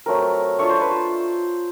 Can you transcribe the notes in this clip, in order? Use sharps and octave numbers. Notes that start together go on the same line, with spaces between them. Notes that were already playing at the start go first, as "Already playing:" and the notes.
F#3 A3 C4 A#4
A3 D4 F4 C#5
C5
B4
C5